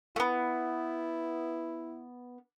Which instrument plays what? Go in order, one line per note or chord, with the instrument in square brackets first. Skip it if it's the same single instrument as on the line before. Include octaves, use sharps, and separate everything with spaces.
[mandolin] A3 B3 [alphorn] E4